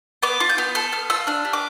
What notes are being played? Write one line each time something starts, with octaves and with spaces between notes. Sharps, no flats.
B3 D6
F4
G6
B3
A4 F6
B3 F6
F4 E6
D4 F6
G4
D6